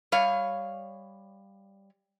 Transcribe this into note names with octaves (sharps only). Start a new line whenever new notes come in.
G3 C#5 F5